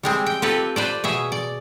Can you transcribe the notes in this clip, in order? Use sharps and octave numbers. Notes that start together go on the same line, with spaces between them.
G3 G#3 C4
G5
C4 F4 G4 A4 B4
B4 C5 D5
B2 G#4 E5
D5